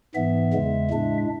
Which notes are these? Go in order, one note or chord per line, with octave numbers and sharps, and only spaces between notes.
G#2 E3 B3 E5
E2 C#3 G#3
A2 G#3 D4